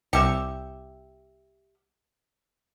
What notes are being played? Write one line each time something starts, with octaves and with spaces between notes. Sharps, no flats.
C2 G4 E5 C#7